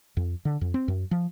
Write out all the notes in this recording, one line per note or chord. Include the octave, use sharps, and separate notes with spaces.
F2
D3
F2
C4
F#2
F3